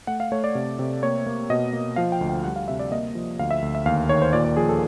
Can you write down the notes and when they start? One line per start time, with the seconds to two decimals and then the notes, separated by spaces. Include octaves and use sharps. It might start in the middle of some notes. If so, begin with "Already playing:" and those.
0.07 A3 F#5
0.20 F5
0.32 A3 C#5
0.44 D5
0.55 C3
0.79 C3
1.03 A#3 C#5
1.26 A#3
1.50 B2 D#5
1.73 A#3
1.96 F3 F5
2.12 G5
2.21 D2
2.29 G5
2.44 G3 F#5
2.56 F5
2.68 C3 E5
2.79 D5
2.92 A#3 D#5
3.15 F3
3.39 D2 F5
3.51 E5
3.62 D2
3.75 E5
3.86 D#2 F5
4.09 D#3 C#5
4.22 C5
4.33 A#2 D5
4.45 D5
4.57 F3 G#4
4.69 A4